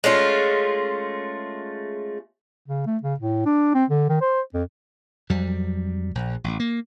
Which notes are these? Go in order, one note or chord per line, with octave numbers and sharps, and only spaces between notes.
G#3 A3 C#4 F4
C#3
A3
C#3
A2
D4
C4
D3
D#3
C5
F2
F2 F#3 G3
A#1
A1
A#3